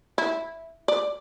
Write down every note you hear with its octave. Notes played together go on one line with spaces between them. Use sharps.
E4
D5